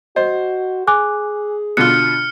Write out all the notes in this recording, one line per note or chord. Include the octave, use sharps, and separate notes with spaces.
F#4 C5 D#5
G#4 G#5 D6 F#6
B2 D3 F4 F6 F#6 C#7